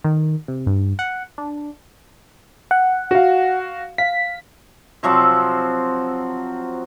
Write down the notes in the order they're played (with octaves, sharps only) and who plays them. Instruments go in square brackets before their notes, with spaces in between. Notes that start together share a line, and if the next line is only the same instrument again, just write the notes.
[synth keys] D#3
C3
G2
F#5
D4
[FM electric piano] F#5
[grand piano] F#4 F5
[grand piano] F5 [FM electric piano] B6
[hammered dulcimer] C3 F3 F#3 C4